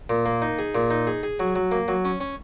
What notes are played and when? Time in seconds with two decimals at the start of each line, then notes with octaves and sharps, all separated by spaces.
0.10 A#2
0.26 A#3
0.42 D#4
0.59 G#4
0.75 A#2
0.90 D#4
1.07 G#4
1.23 G#4
1.40 F#3
1.56 F#3
1.71 A#3
1.88 F#3
2.05 C#4
2.20 C#4